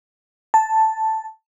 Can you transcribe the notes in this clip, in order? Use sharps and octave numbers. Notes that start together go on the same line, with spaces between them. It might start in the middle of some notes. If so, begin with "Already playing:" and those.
A5